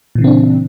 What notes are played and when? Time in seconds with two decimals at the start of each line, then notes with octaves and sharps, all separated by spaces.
0.15 A#2
0.18 E3
0.21 C#3
0.24 C4
0.27 D4